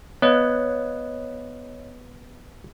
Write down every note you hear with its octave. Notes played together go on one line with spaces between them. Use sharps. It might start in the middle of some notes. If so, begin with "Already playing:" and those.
B3 C#5 D#5 F5